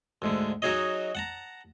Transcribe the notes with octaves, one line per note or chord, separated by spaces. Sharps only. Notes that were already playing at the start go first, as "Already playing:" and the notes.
D2 G#2 D3
F#3 D#4 F#4 G#4 C#5 D#5
F#5 A5 A#5